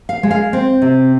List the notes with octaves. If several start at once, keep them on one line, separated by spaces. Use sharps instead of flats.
F5
G#3
F5
C4
C3